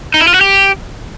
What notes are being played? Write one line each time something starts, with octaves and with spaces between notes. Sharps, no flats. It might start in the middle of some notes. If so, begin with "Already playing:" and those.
D#4
E4
F4
F#4
G4